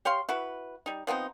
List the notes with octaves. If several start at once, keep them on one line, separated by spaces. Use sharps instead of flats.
G4 C#5 F5 C6
E4 F#4 B4
G3 D#4
F3 B3 C4 D#4